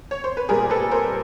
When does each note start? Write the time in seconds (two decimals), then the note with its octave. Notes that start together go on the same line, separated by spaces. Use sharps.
0.11 C#5
0.24 C5
0.37 B4
0.49 A#2 G3 B3 G#4 A#4
0.70 A4 B4
0.91 A#4 C5